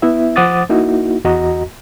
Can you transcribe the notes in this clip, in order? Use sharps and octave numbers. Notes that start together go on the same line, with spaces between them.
B3 E4 E5
F3 C5 F#5 D6 D#6 A6
A#3 D#4 E4 F#4
E2 F#4 D#5 A#5